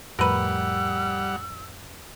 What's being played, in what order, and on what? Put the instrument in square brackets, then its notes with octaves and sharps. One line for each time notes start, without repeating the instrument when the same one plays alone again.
[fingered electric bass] F2 A2 [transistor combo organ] G3 F#5 [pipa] A#4 B4 [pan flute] E6